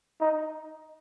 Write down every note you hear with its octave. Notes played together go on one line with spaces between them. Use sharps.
D#4